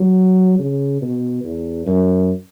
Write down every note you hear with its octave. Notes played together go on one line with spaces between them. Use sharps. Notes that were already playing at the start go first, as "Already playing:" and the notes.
Already playing: F#3
C#3
B2
E2
F#2